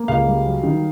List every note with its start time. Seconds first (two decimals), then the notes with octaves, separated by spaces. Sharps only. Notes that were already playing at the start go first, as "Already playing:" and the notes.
Already playing: A#3
0.08 C#2 F5
0.27 G3
0.46 F#3
0.63 D#3